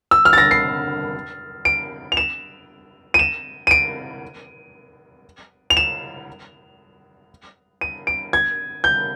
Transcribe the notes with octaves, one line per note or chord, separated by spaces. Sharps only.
E6
F6
A6
A#6
C7
D7
F7
E7
D#7
E7
D#7
D7
F7
E7
D#7
D7
G#6
G6